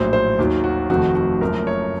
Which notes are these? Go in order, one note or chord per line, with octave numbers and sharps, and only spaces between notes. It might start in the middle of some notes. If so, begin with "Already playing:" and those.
Already playing: A#1 A2 F#3 C5
C5
D#2 D#3 F#3
F#4
F1 F2 D#3 A3 F#4
F#4
F#1 F#2 F3 A3 A#4
C#5